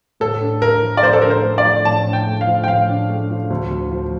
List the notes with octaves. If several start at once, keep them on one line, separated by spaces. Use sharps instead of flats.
A2 A4
D4
A3 A#4
F3
D5
A2 C5
A4
D4 A#4
C5
A3
D5
F3
A2 A5
D4
G5
A3
F5
F3
G5
A2 F5
D4
A3
F3
D2
D2
F3